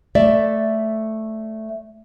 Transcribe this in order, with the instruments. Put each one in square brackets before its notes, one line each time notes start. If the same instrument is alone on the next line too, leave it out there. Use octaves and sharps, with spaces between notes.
[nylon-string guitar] A3 D5 E5